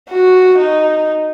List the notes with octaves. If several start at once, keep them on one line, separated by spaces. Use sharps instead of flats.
F#4
D#4